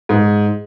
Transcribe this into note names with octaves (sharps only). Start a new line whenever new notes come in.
G#2